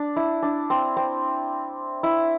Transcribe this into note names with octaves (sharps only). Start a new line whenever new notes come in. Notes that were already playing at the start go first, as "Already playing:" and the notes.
Already playing: D4
E4
D4
C4
C4
E4